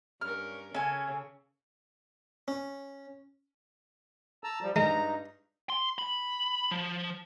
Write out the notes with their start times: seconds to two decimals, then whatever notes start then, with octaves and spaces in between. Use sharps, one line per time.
0.21 G2 C#4 A#4 F6
0.74 C#3 C#4 A4 G#5
2.48 C#4
4.44 A5 A#5 E6
4.62 F3 G3
4.76 G2 G#3 D#4 A#5
5.70 C6
5.99 B5
6.71 F3